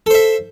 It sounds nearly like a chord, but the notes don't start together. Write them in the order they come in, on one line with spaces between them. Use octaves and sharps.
A4 C5 E5